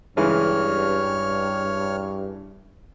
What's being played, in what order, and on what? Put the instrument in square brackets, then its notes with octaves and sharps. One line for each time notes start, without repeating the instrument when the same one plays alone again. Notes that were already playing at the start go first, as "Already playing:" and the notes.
[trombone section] G2 [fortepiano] C#3 E3 G#3 [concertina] C#5 F6